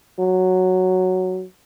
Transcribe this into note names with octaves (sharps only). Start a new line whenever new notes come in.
F#3